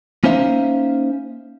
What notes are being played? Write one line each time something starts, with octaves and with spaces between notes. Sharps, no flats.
A#3 C#4 D#4 C5 E5 F5